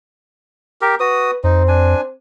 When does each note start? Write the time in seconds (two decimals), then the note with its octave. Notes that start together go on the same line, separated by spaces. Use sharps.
0.81 G4 A#4
1.00 F#4 B4 D#6
1.44 F2 C4 D#4
1.68 D4 G#5